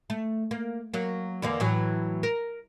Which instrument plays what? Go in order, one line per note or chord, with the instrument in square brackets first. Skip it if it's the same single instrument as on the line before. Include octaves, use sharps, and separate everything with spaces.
[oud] A3
A#3
F#3 A#3
E2 D3 A#3
A2 E3 F#3
A#4